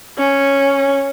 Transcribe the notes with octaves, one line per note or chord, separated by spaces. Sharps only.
C#4